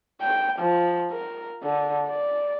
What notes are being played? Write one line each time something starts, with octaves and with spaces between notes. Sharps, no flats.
G5
F3
A#4
D3
D5